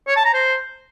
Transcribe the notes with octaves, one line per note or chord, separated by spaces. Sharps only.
C#5
A5
A#5
C5